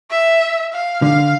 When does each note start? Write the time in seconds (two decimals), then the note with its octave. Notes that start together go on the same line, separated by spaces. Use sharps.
0.11 E5
0.73 F5
1.02 D3 F5